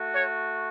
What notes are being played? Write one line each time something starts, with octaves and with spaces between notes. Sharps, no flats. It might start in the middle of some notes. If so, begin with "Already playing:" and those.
Already playing: A3 F#4
C#5